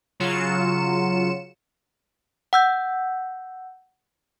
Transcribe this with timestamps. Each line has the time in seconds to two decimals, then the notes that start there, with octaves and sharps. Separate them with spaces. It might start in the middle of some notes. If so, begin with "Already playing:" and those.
0.20 C#3 F#3 F4 C#7 E7
2.53 F#5 E6 G6